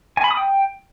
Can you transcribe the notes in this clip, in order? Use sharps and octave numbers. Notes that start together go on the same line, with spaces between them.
G#5
B5
D#6
G5